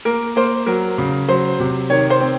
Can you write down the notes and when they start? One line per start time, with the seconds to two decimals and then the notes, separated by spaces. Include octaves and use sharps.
0.05 A#3 A#4
0.36 A#3 C5
0.66 F#3 A#4
0.98 C#3
1.28 F#3 C5
1.60 C3
1.90 D#3 C#5
2.10 C5
2.20 C4